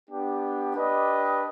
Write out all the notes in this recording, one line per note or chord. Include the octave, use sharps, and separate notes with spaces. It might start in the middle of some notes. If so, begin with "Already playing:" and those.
B3 D4 G4
D4 G4 B4 D#5